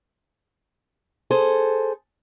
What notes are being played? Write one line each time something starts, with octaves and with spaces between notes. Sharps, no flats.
G#4 A4 C5